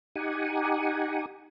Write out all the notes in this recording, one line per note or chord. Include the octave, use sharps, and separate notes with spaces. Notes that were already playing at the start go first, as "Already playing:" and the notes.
D#4 G4 F#5 G#5